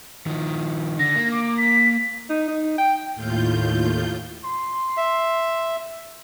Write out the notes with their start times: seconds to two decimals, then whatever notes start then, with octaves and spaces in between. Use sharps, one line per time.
0.26 D#3 F3
0.99 D3 A#6
1.16 A#3
1.31 D6
1.58 B6
2.29 D#4
2.48 D#4
2.78 G5
3.15 D#2 A2 F4 G6
4.44 C6
4.97 E5